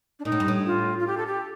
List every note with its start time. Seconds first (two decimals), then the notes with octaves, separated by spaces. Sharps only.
0.19 D4
0.25 A#2 D#4
0.32 A2
0.40 G2
0.48 A2
0.66 F4
0.99 F4
1.07 G4
1.17 A4
1.27 G4